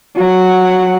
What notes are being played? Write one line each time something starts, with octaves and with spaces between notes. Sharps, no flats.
F#3 F#5